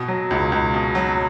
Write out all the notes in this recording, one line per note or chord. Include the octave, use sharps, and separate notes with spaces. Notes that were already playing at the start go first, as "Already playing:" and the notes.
Already playing: B2
F#3
C#2
C#2
B2
F#3